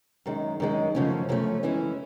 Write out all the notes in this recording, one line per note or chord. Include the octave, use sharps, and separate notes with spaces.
F#2 D#3 G#3
F#2 D#3 G#3
F#2 C#3 F3 A3 C#4
F#2 C#3 F3 A3 C#4
E3 G#3 C#4 E4